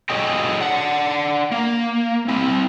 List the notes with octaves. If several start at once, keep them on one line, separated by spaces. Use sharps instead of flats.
F#4 G#4 A4 C#5 D#5 G5
D4 F#5
A#3
C4 E4